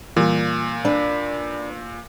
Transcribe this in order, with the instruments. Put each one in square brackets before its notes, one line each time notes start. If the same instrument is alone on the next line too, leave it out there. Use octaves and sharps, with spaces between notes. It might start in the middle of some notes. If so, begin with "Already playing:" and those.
[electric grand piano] A#2 [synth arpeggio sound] E3 G3
[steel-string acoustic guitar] D4 B4